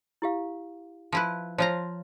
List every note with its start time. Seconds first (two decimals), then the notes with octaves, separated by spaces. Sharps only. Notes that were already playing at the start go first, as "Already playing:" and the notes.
0.22 E4 G4 F5
1.12 F3 E4 B4
1.58 F3 F4 C5 C#5 A#5